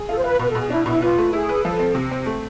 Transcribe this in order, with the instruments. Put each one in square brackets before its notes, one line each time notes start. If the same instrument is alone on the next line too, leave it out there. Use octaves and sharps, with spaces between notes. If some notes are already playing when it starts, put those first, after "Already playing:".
Already playing: [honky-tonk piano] G#4
[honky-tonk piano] F4 [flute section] A4
[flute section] C5
[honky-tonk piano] F4 [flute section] B4
[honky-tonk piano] B2 [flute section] B4
[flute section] A4
[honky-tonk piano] B2
[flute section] G#4
[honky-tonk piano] D4 [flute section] E4
[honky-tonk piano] B2 [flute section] E4
[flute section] F4 [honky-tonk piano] B4
[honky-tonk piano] A3
[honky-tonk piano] E4 [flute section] G#4
[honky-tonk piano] B4
[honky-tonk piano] F3 [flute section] A4
[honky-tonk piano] C4
C3
C4
A3